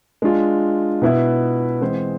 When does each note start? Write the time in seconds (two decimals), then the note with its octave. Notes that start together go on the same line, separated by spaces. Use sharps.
0.22 G#3 D4 F4
1.02 B2 B3 E4 B4 E5
1.81 E3 G#3 C4 G#4 C5